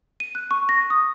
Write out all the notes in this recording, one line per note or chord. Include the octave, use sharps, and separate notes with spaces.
D#7
F#6
C#6
A#6
D#6